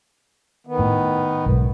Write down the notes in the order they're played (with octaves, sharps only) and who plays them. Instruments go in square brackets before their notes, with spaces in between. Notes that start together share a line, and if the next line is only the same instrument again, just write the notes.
[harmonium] D#3 B3
[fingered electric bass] A2
B1 G#2